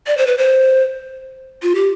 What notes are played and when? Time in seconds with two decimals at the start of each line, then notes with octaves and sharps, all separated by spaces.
0.07 D5
0.18 C5
0.27 B4
0.38 C5
1.62 F4
1.75 G4